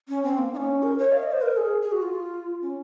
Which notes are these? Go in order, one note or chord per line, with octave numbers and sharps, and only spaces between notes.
C#4
C4
A#3
D#4
C#4
A#4
C#5
F5
D#5
C5
A#4
G#4
G#4
F#4
F4
C#4